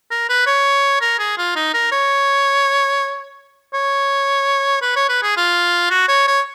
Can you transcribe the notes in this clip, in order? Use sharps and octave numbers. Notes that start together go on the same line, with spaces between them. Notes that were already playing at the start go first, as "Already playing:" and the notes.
A#4
B4
C#5
A#4
G#4
F4
D#4
A#4
C#5
C#5
B4
C#5
B4
G#4
F4
F#4
C#5
C#5